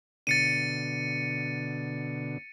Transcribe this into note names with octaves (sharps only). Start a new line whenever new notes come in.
B2 D3 A6 C#7 D#7